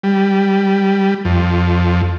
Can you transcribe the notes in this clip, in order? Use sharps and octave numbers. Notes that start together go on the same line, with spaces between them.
G3
F2